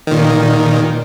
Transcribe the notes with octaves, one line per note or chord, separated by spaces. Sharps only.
A#2 D#3